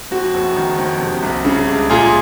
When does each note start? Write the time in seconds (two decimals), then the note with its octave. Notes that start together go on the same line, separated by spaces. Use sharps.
0.11 F2 F#4
0.34 F#1
0.56 D#3
0.78 F2
1.00 C3
1.23 C2
1.45 C#3
1.68 C#2
1.90 A#2 F4 G#4